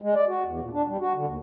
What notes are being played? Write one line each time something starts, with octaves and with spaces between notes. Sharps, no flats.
G#3
D5
F#4
E2
A#2
D4
G3
F#4
D3
D#2